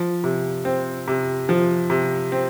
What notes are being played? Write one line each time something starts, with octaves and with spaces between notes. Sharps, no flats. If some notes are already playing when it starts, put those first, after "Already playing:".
Already playing: F3
C3
C4
C3
F3
C3
C4